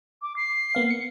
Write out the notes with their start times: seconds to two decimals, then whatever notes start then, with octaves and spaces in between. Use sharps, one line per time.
0.22 D6
0.36 C7
0.75 A#3 B3 F5
0.90 C#7